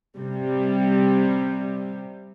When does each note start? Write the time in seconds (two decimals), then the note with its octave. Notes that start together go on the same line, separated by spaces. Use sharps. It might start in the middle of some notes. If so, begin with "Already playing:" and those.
0.17 C3 G3